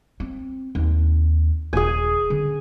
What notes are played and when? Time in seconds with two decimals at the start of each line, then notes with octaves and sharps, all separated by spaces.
0.20 C4
0.75 D#2 C4
1.73 D#1 F3 G#4 G#5
2.30 D3 C#4